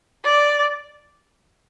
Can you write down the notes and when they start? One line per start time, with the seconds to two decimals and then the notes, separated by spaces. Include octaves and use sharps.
0.24 D5